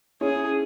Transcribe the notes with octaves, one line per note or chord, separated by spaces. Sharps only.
C#4 E4 G#4